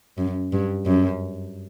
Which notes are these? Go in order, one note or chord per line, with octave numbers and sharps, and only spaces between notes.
F#2
G2
F#2